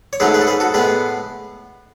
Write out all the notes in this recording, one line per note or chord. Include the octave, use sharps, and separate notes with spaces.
C#5
G#2 F#3 A3 C#4 G#4 B4
G#4 B4
A4
G#4 B4
F#4 A4
A2 G#3 B3 G#4 B4